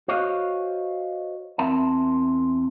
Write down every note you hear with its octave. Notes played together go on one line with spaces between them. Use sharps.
F#4 C5 C#5 D#5 F5
E2 C4 A#4 E5 A5